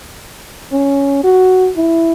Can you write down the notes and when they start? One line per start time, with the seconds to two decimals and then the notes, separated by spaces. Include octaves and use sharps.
0.72 C#4
1.24 F#4
1.77 E4